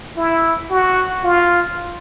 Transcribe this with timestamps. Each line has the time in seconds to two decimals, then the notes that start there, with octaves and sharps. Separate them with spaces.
0.17 E4
0.70 F#4
1.24 F4